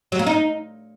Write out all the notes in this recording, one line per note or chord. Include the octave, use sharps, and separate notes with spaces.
F#3
A#3
D#4